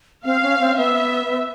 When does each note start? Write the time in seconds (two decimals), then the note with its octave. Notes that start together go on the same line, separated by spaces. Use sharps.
0.25 C4 F5
0.43 C#4
0.60 C4
0.77 B3 E5